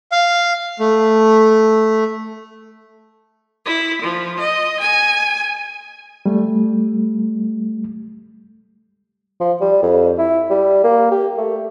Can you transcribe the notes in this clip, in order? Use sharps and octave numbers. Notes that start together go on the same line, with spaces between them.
F5
A3
E4
F3
D#5
G#5
G3 A3
F3
G3
F2
E4
G3
A#3
G4
A3